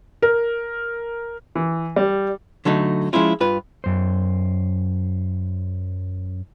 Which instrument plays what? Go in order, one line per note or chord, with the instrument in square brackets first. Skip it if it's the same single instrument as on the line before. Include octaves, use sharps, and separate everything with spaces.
[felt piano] A#4
[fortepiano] E3
G3
[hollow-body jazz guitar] D3 F#3 A3 D#4
F3 G#3 C#4 E4 F4
G2 F4 B4
[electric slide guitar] F#2 C5